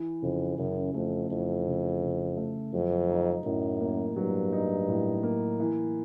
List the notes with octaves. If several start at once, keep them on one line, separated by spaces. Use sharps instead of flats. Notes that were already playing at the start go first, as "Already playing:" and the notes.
Already playing: E3
F2 C#3
F#2 C#3
F2 A3
F2 E3
C#3
C#3
A3
F2 F#3
D#4
F#2 A2
A#3
G2 F#3
D#4
A2
A#3
E3